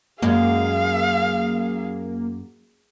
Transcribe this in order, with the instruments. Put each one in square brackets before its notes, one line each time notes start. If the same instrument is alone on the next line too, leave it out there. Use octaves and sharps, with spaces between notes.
[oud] F#2 G#3 [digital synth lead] A#3 [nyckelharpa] G#4 [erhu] F5